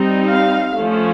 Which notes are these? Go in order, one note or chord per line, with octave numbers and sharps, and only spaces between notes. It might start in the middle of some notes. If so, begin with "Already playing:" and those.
Already playing: G3 C4 D#4
F5
F3 A3 C#4